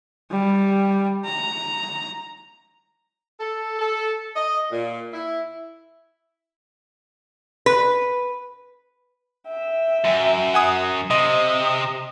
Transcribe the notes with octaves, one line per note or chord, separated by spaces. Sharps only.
G3
A#5
A4
A4
D#5
A#2
E4
B4
E5 G5
F#2
F#5 G#5 D#6
C3 D#5 D#6